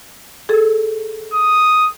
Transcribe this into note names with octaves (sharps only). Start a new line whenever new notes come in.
G#4 A4
D#6